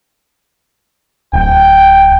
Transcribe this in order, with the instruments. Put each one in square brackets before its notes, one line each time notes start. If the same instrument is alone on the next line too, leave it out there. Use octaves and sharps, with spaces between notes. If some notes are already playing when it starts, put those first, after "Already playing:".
[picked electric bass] D1 [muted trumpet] G5